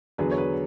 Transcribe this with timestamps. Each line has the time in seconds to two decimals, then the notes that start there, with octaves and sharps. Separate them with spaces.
0.18 E2 D3 F#3 G#4 B4
0.31 C#5
0.38 G#4 B4